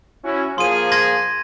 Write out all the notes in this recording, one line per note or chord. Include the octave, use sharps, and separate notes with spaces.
C#4 E4 F#4
F3 A#3 G#4 C6 D#7
C6 G#6 A#6